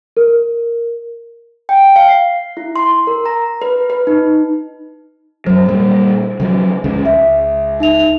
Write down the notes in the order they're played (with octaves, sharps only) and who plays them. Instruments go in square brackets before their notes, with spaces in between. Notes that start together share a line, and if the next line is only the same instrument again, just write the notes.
[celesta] A#4
[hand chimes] G5
F5
C7
E4
C6
A#4
A#5
B4
B4
D#4
[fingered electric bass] F#2 F#3 [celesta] C5
[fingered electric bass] A#2 G3 A#3
C#3 F3 F#3
D2 C#3 G#3
[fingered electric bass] C#2 [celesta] E5
[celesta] D#4 E5 F7